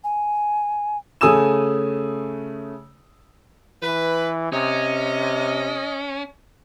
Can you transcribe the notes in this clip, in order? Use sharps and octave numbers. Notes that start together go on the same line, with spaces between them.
G#5
C#3 A3 G#5 D#6 E6 E7
E3 B4
C3 C#4 D#5